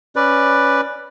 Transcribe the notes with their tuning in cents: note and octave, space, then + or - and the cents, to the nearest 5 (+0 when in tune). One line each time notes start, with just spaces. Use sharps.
C#4 +0 B4 +0 D5 +10